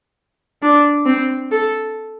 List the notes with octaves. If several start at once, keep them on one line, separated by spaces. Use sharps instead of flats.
D4
C4
A4